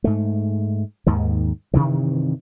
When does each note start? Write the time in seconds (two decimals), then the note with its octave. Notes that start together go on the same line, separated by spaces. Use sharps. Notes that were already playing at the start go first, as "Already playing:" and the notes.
0.04 G#2 A3
1.07 D#2 G#2 D#3
1.74 G2 C3 D#3 E3